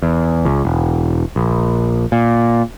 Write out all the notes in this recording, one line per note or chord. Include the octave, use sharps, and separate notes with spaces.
E2
C#2
E1
A#1
A#2